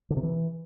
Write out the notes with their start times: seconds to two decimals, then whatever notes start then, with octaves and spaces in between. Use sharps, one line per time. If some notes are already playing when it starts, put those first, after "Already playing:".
0.10 D3
0.17 C3
0.23 E3